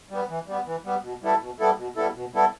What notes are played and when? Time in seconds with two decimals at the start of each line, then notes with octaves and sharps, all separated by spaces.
0.11 G3 B3
0.29 E3
0.48 G3 B3
0.66 E3
0.85 G3 B3
1.03 B2
1.22 G3 B3 E4 A4
1.41 B2
1.60 G3 B3 E4 A4
1.78 B2
1.96 G3 B3 E4 A4
2.15 B2
2.34 G3 B3 E4 A4